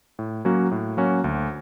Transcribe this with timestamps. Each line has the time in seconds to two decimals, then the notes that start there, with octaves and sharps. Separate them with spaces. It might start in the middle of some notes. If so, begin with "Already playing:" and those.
0.19 A2
0.45 F#3 A#3 C#4 F#4
0.71 A2
0.97 F#3 A#3 C#4 F#4
1.24 D2